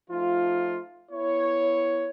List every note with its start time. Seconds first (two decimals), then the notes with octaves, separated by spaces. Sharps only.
0.10 F3 A3 D#4 F4
1.12 B3 E4 C#5